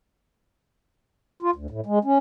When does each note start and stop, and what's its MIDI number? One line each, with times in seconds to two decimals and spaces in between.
1.42 1.51 65
1.55 1.67 38
1.70 1.81 45
1.86 1.99 56
2.05 2.18 61